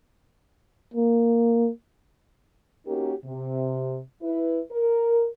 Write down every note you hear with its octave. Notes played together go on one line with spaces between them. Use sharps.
A#3
A#3 C#4 D#4 F#4 G4 A#4
C3
E4 B4
A#4